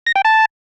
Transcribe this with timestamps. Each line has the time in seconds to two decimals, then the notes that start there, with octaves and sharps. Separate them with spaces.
0.07 A#6
0.16 G5
0.25 A5